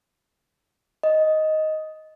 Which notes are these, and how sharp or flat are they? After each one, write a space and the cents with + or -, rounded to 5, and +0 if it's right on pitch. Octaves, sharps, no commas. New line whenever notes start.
D#5 +5